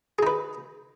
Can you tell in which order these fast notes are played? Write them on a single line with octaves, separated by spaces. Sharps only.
G#4 D#4 B4